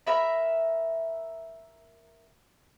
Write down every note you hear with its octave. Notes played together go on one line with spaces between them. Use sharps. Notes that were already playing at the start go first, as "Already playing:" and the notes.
A#4 E5 B5